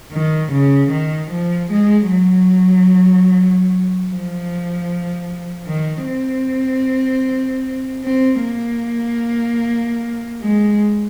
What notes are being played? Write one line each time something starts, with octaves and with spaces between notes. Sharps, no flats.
D#3
C#3
D#3
F3
G#3
F#3
F3
D#3
C4
C4
A#3
G#3